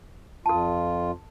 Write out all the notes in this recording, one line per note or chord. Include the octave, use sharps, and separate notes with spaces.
F2 F4 A4 A5